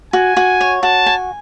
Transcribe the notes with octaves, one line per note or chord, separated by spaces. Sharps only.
F#4 G#5
F#4
C#5
F#4 A5
G#5